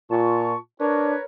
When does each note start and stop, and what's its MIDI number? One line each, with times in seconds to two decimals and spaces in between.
0.11 0.54 46
0.11 0.56 65
0.11 0.56 81
0.11 0.56 85
0.80 1.15 62
0.80 1.23 70
0.80 1.23 71
0.80 1.23 73